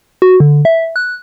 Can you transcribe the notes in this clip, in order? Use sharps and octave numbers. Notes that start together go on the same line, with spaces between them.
F#4
D3
E5
F#6